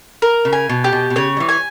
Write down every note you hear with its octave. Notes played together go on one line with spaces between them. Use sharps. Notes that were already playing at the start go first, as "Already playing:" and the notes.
A#4
C#3
G#5
B2
G4
B2
B2
C#3 C#5
G3
E3
G#5